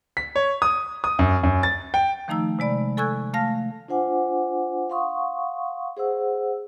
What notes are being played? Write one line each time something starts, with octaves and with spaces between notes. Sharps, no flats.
B6
C#5
D#6
D#6
F#2
F#2
A6
G5
D#3 F3 A3 D#4 A#5 E6
C3 G#3 D5 B5
A4 G#5 C#6 E6 F#6 G#6
A3 F5 A5 F6 A#6
D4 F4 C5 F#5 G#5 D6
F5 F#5 C6 C#6 D#6
G#4 C5 F#5 E6